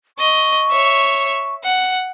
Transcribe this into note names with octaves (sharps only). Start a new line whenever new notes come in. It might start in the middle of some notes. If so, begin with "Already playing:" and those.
D#5 C#6
C#5 E5
F#5